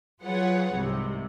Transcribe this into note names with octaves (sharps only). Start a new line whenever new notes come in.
F#3 F4 G#4 B4 C#5 F#5
C2 G#2 C3